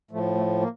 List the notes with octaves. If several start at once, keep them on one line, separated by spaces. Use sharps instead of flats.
A2 F3 A3
A3
A#3